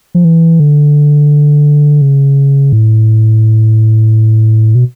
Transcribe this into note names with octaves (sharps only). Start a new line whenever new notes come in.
F3
E3
D3
C#3
A2
B2